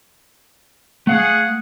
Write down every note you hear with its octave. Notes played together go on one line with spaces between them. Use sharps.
A3 G#4 F5 F#5